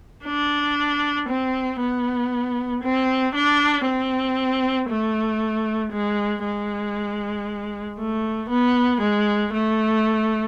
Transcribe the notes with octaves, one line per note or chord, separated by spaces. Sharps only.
D4
C4
B3
C4
D4
C4
A3
G#3
G#3
A3
B3
G#3
A3